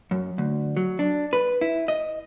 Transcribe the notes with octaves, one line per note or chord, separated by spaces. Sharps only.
F#2
D2
F#3
D4
B4
E4
D#5